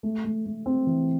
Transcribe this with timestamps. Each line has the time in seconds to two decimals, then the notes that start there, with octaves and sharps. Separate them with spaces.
0.03 A3
0.24 A3
0.46 A3
0.66 C4
0.87 E3